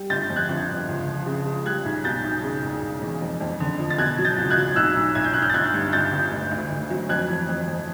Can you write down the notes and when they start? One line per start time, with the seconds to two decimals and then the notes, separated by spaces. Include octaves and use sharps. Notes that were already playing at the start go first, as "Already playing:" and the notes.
Already playing: G3
0.10 G1 G6 A6
0.30 F2
0.36 F#6 G#6
0.49 G1
0.69 G1
0.88 C#2
1.07 F3
1.26 C#3
1.46 G#3
1.66 G3 F#6 G#6
1.85 B1
2.04 B2 G6 A6
2.24 B1
2.43 C#3
2.63 E1
2.82 E1
3.02 E2
3.21 F2
3.41 F2
3.60 D3
3.79 F3
3.90 A6
3.98 B2 F#6 G#6
4.18 F#3
4.25 G6 A6
4.38 C#2
4.50 F#6 G#6
4.57 F#3
4.76 B1 E6 F#6
4.96 B1
5.15 B1 G#6
5.24 G6
5.33 B1 F#6
5.42 F6 G6
5.50 A6
5.54 G1 F#6 G#6
5.74 G2
5.92 G1 G6 A6
6.12 G1
6.32 D2
6.51 D2
6.71 D2
6.90 F#3
7.09 F2 F#6 G#6
7.29 E3
7.48 F2
7.67 F2